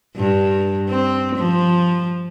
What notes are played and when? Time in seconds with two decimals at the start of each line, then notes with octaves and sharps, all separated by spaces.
0.16 G2
0.89 C4
1.36 F3